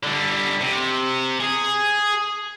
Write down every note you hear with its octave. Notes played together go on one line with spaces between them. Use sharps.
D3 G3
C3
G#4